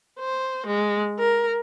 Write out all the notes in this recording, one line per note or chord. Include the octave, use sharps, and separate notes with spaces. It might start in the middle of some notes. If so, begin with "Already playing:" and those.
C5
G#3
A#4